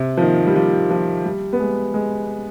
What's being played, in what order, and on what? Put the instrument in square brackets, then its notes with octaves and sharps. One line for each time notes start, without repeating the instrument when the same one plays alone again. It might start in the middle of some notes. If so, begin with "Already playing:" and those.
Already playing: [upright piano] C3
F3
D#3
G3
F3
F3
G3
B3
G#3
G#3